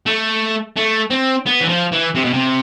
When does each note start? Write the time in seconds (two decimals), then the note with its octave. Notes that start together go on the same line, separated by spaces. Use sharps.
0.06 A3
0.76 A3
1.10 C4
1.46 B3
1.60 E3
1.69 F3
1.92 E3
2.15 C3
2.25 B2
2.33 C3